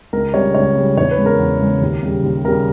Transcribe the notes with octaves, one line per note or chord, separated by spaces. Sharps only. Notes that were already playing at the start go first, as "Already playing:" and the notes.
C#2 A#4
C#3 G3 C#5
C#2 C#5
C#3 G3
E2 C#5
B4
C#3 G#3
A#4
E2
C#3 G#3
D#2
C#3 G3
D#2
C#3 G3 A#4